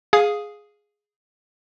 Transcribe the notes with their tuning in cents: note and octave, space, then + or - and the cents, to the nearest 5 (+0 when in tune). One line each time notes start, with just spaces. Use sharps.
G#4 +0 F5 +15 D#6 +0